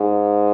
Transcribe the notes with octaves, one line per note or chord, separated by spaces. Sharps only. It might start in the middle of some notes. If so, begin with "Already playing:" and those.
Already playing: G#2